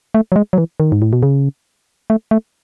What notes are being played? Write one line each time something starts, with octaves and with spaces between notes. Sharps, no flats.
A3
F#3
G#3
F#3
E3
D#3
G#2
A2
B2
C#3
A3
A3